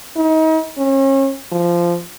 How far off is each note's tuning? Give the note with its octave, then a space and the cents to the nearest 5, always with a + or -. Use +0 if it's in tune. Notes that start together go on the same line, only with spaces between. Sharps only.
D#4 +35
C#4 -35
F3 -15